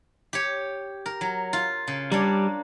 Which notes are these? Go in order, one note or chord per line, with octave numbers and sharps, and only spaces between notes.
G4 C#5
A#4
F#3
F4
C#3
G3 A#3 D4 C#5